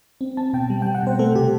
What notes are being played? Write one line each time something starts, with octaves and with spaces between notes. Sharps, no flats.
C4
C4 A5
B2 G5
G3
G5
G3
F#5
B2 C5
A3 A4
C3 G4